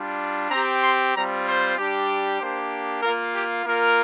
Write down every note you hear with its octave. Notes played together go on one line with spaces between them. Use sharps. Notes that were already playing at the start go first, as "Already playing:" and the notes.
Already playing: G3 D4 F4
C4 G4 A#5
C6
G3 C4 F4 A#5
C5
G3 D4 G4
A#3 D4 G4 C5
A#3 F4 A#4
G4
A#3 F4 A#4